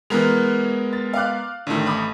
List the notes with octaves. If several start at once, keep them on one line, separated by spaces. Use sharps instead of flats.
E3 G#3 B3 A#4 F7
A6
F5 D6 F#6
A1 D3 D#3 A3
B5 D6 D#6